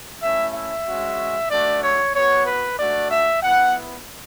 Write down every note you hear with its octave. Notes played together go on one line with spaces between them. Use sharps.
A3 C#4 E4 E5
E5
G#3 C#4 F#4
A3 D4 F#4 D5
C#5
B3 F#4 C#5
B4
A3 D4 F#4 D5
E5
B3 E4 F#5